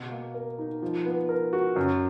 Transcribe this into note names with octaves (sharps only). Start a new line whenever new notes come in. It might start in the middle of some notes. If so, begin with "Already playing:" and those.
Already playing: B2
A#3
A#4
D#4
F3
B3
A#4
F#4
F#2